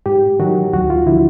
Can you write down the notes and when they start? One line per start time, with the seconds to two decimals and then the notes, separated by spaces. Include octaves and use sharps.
0.06 G#2 G4
0.40 D#3 F#3 F#4
0.73 D2 F#4
0.90 F4
1.06 D3 F3 E4